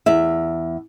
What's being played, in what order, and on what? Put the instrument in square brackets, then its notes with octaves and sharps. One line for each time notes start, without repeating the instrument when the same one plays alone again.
[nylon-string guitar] E2 E5